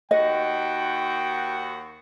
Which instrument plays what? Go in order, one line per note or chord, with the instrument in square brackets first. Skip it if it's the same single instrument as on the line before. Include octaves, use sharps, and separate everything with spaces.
[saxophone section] D#2 F#4 [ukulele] D#5 [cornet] G5